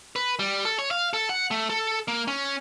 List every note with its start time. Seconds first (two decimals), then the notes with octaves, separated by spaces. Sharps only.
0.16 B4
0.39 G3
0.65 A4
0.79 C#5
0.91 F5
1.13 A4
1.29 F#5
1.51 A3
1.70 A4
2.08 A#3
2.28 C#4